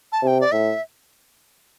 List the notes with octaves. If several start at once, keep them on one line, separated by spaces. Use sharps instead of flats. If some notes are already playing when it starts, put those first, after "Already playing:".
A5
C3 G5 A5
D5
A2 E5